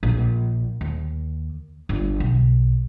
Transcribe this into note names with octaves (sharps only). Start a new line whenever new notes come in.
A#1
D#2
G1
B1